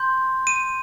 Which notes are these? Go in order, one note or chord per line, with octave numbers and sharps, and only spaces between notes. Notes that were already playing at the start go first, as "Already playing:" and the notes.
Already playing: C6 G6
D#7